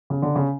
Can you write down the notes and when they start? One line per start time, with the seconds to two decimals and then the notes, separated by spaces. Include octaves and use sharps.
0.10 C#3
0.22 D3
0.36 C#3